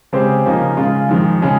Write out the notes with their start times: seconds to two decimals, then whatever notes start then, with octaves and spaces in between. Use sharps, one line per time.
0.13 C#3 G#3 C4 G4 C5
0.46 C#3 F3 A#3 D#4 A#4
0.77 C#3 G#3 C#4 F4
1.09 F2 D#3 G#3
1.42 C#3 G#3